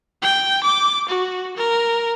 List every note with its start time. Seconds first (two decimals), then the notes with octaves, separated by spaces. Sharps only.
0.22 G5
0.63 D6
1.09 F#4
1.57 A#4